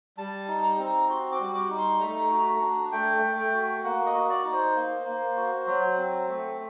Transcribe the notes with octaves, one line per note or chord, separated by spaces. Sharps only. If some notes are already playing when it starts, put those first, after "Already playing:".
G3 A5
D#4
A#5
C4
F#4 C6
D6
G3
D6
D#4
C6
A3 A#5
F#4
D4
A3 G5
A3
G5
F#4
A#3 F#5
D#5
F#4
D5
D#4
C5
A#3
A#3
F#4
F#3
C4
A3